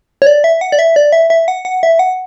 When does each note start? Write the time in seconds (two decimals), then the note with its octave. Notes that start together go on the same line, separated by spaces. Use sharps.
0.22 C#5
0.27 D5
0.44 E5
0.61 F#5
0.72 D5
0.79 E5
0.96 D5
1.12 E5
1.30 E5
1.48 F#5
1.65 F#5
1.83 E5
1.99 F#5